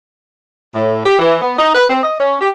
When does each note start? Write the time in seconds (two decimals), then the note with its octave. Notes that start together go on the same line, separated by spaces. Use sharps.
0.74 A2
1.05 G4
1.19 E3
1.42 B3
1.59 D#4
1.75 B4
1.90 C4
2.03 D#5
2.19 C#4
2.40 G4